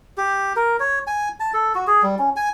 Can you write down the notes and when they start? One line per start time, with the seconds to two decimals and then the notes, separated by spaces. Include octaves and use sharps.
0.17 G4
0.56 A#4
0.80 C#5
1.07 G#5
1.40 A5
1.54 A4
1.75 F#4
1.87 G#4
2.03 G3
2.19 C#4
2.36 G#5